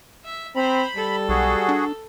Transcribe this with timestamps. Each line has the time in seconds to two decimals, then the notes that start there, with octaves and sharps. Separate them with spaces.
0.25 E5
0.56 C4 C5 A#5 B5
0.96 G3 A4
1.29 B1 F#4 G#4
1.69 D4